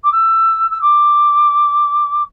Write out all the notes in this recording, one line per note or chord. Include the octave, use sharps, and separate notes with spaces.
D6
E6
E6
D6